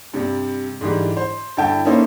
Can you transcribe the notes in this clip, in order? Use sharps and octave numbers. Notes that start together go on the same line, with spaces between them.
G2 C3 G3
G#2 D3 E3 G3
C5
G2 D3 E4 G5 A5
A#3 C#4 D#4 E4 A4 C5